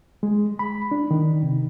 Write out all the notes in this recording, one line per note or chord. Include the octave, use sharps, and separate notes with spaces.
G#3
B5
D4
D#3
C3